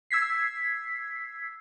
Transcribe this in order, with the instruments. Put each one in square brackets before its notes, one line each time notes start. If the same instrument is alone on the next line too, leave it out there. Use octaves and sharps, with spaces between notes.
[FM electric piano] E6 G#6 B6 C7